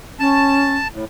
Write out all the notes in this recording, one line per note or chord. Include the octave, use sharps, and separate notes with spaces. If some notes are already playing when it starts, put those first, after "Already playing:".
C#4 A5
A2